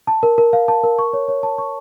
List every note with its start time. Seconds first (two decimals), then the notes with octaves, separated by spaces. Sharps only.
0.07 A5
0.23 A#4
0.38 A#4
0.53 F5
0.68 A5
0.83 A#4
0.99 C#6
1.13 C#5
1.28 C#5
1.43 A5
1.58 C#6